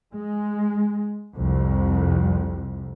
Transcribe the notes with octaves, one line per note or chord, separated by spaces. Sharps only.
G#3
C2 F2